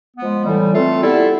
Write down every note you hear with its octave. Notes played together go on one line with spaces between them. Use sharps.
F3 G#3 B3
A2 E3 G3
A3 C4 F4 A4
G3 B3 E4 A4